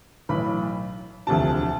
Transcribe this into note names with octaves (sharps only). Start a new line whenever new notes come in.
B1 A2 E3 B5
E1 D2 C3 F3 A5